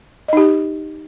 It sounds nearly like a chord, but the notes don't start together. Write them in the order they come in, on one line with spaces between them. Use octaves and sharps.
D#5 D#4 G4